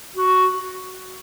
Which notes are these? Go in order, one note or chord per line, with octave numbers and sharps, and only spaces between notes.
F#4